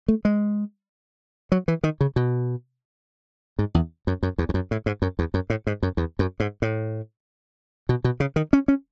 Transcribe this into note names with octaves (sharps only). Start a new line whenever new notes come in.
A3
G#3
F#3
E3
D#3
C#3
B2
G#2
E2
F#2
F#2
E2
E2
F#2
A2
G#2
F#2
E2
F#2
A2
G#2
F#2
E2
F#2
G#2
A2
B2
B2
C#3
D#3
C#4
C#4